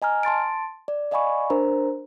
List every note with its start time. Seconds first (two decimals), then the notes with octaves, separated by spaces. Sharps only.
0.02 D#5 G#5 A#5 F6
0.23 A5 C6 A6 D7
0.88 D5
1.11 D5 D#5 F5 G#5 B5 C#6
1.50 D4 A#4 C5 A#5